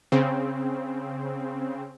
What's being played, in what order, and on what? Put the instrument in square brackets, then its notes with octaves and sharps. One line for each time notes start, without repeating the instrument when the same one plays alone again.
[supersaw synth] C#3 C4